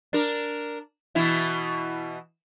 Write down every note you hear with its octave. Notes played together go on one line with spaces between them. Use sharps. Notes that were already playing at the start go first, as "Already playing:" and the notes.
D4 A#4
B2 E3 E4